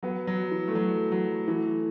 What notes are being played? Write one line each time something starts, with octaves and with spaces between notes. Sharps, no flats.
F#3 B3
F#3
E3
A3
F#3
F#3
E3 A3